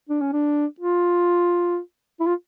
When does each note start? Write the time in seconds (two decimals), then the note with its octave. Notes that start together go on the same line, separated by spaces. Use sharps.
0.09 D4
0.21 C#4
0.33 D4
0.80 F4
2.20 E4
2.27 F4